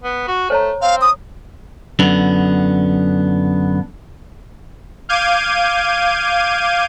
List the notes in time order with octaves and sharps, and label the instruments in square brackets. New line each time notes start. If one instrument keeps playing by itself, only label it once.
[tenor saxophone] B3
F#4
[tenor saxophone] A3 [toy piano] C5 C#5 A#5
[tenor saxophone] C4 [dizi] F5
[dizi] D#6
[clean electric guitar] F#2 D3 B3
[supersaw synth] F5 D6 G6 G#6 D#7